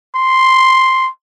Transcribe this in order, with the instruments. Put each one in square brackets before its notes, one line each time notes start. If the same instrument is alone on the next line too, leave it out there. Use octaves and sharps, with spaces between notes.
[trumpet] C6